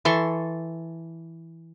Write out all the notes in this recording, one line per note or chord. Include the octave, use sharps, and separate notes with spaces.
E3 A4 C6 C#6